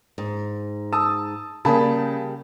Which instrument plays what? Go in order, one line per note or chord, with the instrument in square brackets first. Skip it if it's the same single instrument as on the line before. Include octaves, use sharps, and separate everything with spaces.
[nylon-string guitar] G#2
[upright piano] A5 D#6 E6
[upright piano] C#3 A5 B5 [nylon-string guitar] G3 A#3 G#4